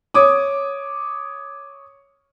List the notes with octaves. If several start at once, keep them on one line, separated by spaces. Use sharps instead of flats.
C#5 D6 D#6